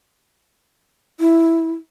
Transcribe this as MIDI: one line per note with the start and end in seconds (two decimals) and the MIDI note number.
1.20 1.72 64